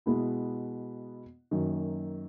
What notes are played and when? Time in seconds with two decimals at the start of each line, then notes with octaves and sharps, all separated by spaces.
0.06 B2 G#3 B3 E4
1.51 F#2 D#3 A#3